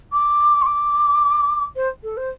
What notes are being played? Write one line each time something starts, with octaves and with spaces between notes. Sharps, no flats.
D6
C6
D6
C5
A4
C5